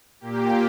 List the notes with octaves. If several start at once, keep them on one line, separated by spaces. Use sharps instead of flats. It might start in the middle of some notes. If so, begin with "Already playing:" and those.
A#2 A#3 G4